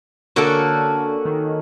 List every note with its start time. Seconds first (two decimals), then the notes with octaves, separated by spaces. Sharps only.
0.36 D3 A#3 C#4 F#4 A4
1.25 D#3